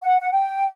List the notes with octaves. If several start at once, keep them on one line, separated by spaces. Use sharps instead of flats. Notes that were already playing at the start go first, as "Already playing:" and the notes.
F#5
F#5
G5